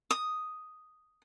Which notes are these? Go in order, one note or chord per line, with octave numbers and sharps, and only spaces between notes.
D#6